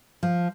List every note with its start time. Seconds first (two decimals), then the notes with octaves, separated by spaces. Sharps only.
0.23 F3